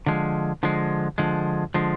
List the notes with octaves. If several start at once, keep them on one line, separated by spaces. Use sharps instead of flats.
D3 F3 G#3
D3 F3 G#3
D3 F3 G#3
D3 F3 G#3